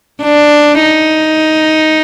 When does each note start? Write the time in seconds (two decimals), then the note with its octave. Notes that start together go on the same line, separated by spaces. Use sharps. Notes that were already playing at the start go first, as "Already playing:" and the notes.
0.23 D4
0.82 D#4